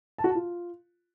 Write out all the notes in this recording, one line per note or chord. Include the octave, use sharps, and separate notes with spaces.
A5
F#4
A5
F4